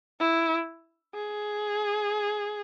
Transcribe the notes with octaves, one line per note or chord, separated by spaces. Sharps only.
E4
G#4